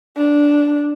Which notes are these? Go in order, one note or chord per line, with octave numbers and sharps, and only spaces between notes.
D4